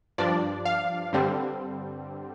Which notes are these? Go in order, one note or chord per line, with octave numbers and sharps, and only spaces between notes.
G2 F3 D4 D5
F5
G2 D3 G3 C4